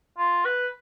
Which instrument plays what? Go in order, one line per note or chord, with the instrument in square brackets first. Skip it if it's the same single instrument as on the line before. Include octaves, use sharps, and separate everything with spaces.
[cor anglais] F4
B4